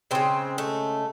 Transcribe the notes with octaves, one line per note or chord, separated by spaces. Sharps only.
C#3 G#3 C4
A3